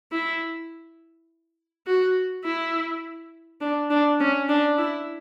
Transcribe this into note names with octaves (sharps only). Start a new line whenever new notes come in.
E4
F#4
E4
D4
D4
C#4
D4
E4